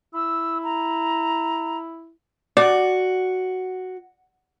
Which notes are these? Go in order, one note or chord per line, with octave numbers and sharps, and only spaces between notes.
E4 E6
A#5
F#4 D5